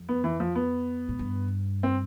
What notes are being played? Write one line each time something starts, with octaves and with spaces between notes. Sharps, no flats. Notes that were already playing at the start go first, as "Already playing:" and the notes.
Already playing: F2
B3
E3
F3
B3
A2
G2
C4